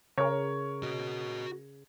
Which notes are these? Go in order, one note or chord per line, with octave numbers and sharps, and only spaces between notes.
C#3 A#4 C#5
F#4 D#5